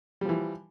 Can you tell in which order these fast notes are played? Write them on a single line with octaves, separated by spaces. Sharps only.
G3 F3 E3